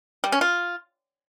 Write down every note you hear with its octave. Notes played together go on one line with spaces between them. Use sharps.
G3
C#4
F4